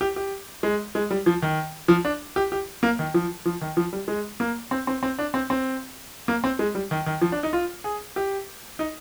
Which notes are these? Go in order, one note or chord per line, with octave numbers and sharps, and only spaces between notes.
G4
G4
G#3
G#3
G3
F3
D#3
F3
D4
G4
G4
A#3
D#3
F3
F3
D#3
F3
G3
G#3
A#3
C4
C4
C4
D4
C4
C4
A#3
C4
G#3
G3
D#3
D#3
F3
D4
D#4
F4
G#4
G4
D#4